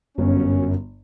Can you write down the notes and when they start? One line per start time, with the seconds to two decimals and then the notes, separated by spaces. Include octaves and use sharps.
0.18 G1 F#2 C#4